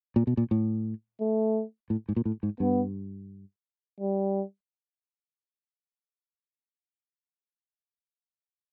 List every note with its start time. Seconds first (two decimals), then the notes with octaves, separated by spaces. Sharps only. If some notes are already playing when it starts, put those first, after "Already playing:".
0.16 A#2
0.27 B2
0.37 A#2
0.51 A2
1.21 A3
1.90 A2
2.09 G#2
2.16 A#2
2.25 A2
2.43 G#2
2.60 G2 B3
4.00 G3